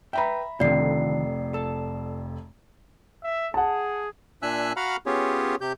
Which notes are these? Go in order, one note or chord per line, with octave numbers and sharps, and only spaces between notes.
B4 E5 G5 A#5 B5
F1 F2 D3 D#3 F4 D5 C7
A4
E5
G#4 F#5 A5
A#2 D4 E5 G#5 E6 F#6
F#4 F5 F#5 A#5 B5 F6
B3 C#4 F4 G4 G#4 C#5
C3 G4 G6